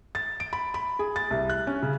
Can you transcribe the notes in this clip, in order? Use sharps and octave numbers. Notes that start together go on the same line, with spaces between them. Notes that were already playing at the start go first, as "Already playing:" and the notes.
A6
D7
B5
B5
G#4
A6
C2
F#6
C#4
C#3